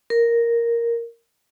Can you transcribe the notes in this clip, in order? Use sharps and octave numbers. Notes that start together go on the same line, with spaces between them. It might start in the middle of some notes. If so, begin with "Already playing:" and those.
A#4